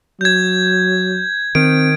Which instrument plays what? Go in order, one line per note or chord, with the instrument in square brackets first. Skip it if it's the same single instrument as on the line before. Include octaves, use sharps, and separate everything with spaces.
[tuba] F#3 [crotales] G6 G#6
[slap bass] D#3 [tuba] C4 [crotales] D7